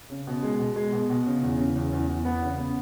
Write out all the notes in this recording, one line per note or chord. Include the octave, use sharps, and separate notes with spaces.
C#3
B2
G#3
B2
G#3
B2
B2
C#3
E2
C#3
E2
E2
E2
B3
C#3
B3